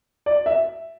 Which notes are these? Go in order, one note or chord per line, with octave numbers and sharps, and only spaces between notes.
D5
E5